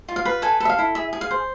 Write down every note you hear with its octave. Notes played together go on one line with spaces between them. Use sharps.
F4
F5
B4
A4 G#5
A4 E5
F5
E4
G#4 E5
G#4
F5
C5